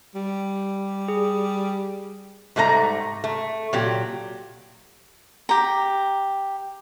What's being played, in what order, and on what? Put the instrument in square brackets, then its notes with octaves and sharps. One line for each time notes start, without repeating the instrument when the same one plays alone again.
[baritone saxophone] G3
[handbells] G#4
[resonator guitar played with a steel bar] G#2 G3 A3 D4 A#5
A3
A#2 F#3 G4
[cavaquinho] G4 A#5